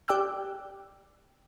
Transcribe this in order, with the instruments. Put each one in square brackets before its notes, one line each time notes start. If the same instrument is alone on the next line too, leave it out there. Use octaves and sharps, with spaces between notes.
[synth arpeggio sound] G4 D5 G5 D6 E6 F#6